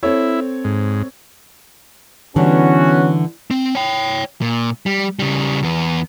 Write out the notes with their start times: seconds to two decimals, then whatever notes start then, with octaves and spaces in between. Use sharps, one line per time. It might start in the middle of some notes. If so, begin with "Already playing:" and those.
0.03 C4 E4 A4 C#5
0.65 G#2
2.36 D3 E3 G3 B3 C#4 F#4
3.51 C4
3.75 C#5 G5
4.41 A#2
4.86 G3
5.19 C#3 G3
5.63 E2 B3